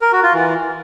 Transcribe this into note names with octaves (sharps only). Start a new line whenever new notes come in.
A#4
F#4
F4
E3